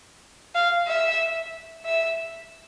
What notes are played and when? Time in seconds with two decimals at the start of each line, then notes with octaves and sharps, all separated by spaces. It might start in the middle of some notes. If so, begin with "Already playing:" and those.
0.55 F5
0.87 E5
1.85 E5